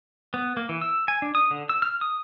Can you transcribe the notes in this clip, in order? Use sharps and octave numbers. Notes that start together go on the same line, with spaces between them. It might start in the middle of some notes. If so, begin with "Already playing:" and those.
B3
A#3
E3
E6
G#5
D4
D#6
D3
E6
F6
D#6